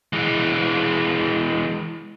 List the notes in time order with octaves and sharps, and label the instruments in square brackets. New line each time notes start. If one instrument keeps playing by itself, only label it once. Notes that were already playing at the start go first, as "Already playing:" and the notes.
[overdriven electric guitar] E3 G#3